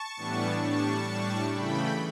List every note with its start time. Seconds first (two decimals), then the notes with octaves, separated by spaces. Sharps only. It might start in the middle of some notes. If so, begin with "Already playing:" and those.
Already playing: A5 C#6
0.17 A2 E3 G3 B3 D4
0.62 A2 G3 D4 A5 C#6
1.07 A2 G3 D4
1.51 C#3 E3 A3 G5 B5